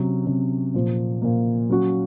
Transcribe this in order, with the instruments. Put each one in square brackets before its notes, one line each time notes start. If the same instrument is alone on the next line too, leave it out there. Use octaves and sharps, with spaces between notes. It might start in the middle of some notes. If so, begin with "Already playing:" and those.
Already playing: [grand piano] C3 F#3 C#4
C3 F#3 C#4
A#2 F3 A#3
A#2 F3 A#3
F#3 C#4 F#4